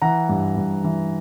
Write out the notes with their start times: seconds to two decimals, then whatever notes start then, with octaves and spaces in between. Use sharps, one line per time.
0.02 E3 F#5 A#5
0.29 G2
0.56 G2
0.84 E3